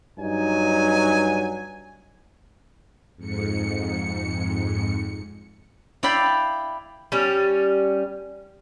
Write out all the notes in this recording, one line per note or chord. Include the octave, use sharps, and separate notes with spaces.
G2 F#3 D#4 G#5
F2 G#2 C#7
E4 D5 F5 G5 B5
G3 C#4